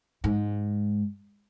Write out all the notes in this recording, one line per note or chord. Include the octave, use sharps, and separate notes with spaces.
G#2